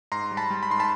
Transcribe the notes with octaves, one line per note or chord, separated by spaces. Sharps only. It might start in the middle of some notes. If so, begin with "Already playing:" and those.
G#2 A#5 C6
G3
A5 B5
G3
B5
G#2 C6
A5 B5